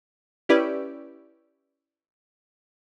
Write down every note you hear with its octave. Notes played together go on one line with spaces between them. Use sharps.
C#4 E4 G4 B4 D5